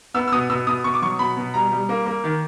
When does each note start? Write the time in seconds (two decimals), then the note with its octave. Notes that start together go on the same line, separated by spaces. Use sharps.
0.14 B3 E6
0.28 E6
0.32 B2 D#6
0.50 B2 E6
0.67 B2 D#6
0.84 B2 C#6
0.94 D6
1.02 F#3 C#6
1.19 B2 B5
1.37 B2
1.54 G3 A#5
1.71 G3
1.89 A#3
2.06 A#3
2.24 D#3